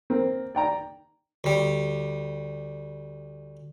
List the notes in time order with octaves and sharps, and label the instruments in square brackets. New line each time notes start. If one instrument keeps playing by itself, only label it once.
[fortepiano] A#3 C4
D5 G5 A#5
[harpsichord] D2 G3